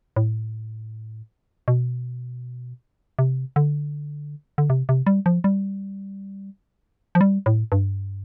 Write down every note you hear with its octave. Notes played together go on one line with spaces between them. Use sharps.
A2
B2
C3
D3
D3
C3
C3
G3
F3
G3
F3
G3
A2
G2